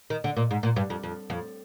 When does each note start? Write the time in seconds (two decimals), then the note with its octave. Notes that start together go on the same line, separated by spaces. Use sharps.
0.10 D#3
0.24 D3
0.37 A#2
0.51 G#2
0.63 A#2
0.76 G2
0.90 F2
1.03 F2
1.30 F2